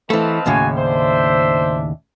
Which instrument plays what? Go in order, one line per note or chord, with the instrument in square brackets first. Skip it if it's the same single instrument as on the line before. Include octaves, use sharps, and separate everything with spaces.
[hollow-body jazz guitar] E3 A3 [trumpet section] C4 B4 D#5 [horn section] F5 A5
[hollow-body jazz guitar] D#2 A2 C#3 [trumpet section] F#4 G#5
[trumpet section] D4 E5 [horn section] C5